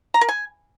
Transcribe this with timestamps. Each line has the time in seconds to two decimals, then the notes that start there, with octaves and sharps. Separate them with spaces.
0.14 A#5
0.21 A#4
0.29 G#5